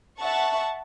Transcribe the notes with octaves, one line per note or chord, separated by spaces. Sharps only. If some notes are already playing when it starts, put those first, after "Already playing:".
E5 F#5 A5 C#6